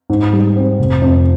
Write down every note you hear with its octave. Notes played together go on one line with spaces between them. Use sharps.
G#2
G3
C4
F1
F2